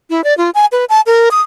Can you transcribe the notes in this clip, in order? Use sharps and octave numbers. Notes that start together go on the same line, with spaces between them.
E4
D5
F4
G#5
B4
A5
A#4
D#6